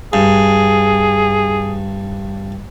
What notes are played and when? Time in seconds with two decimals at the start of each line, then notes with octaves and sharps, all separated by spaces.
0.13 G2 G#4